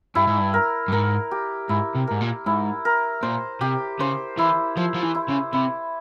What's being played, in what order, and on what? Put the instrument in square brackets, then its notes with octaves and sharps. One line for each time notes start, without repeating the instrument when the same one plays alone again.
[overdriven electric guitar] G2 [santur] E4
[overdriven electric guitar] G#2
G2
[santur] A#4
[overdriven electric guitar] G2
[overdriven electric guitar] G#2 [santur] A#4
[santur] G4
[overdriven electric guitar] G#2 [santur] E4
[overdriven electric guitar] C3
[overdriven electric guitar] G#2 [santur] A#4
[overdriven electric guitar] A#2
[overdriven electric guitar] G#2 [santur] E4
[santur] A#4
[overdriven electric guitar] A#2 [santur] C5
[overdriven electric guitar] C3 [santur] G4
[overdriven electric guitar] C#3 [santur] C5
[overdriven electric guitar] E3 [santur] E4
[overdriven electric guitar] F3 [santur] C5
[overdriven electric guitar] F3
E3
[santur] E4
[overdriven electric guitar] C#3
[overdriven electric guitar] C3 [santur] E4